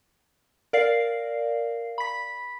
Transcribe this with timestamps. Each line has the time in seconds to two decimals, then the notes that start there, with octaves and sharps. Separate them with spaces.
0.73 A#4 D5 F5 C7
1.98 B5 B6